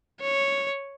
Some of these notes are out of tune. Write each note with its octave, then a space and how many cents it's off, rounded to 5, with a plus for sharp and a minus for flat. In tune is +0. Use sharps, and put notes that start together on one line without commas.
C#5 -5